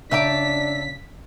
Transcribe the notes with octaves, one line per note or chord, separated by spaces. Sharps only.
C#3 D4 E5 A5 A#5 D6 B6